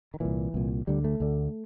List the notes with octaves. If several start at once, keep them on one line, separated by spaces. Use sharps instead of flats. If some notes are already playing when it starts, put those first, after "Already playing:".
D#3
C2 A#2 E3
C2 A#2
D2 D3 G3
A3
D2 D3